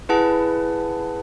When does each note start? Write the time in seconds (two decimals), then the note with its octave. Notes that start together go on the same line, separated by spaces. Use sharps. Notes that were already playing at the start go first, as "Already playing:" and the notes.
0.09 E4 G#4 B4 F#5 A5